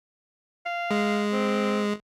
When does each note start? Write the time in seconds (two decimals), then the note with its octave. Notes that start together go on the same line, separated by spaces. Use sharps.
0.66 F5
0.91 G#3
1.33 C4